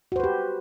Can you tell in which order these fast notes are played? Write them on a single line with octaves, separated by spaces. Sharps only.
F#4 C5 B4 G4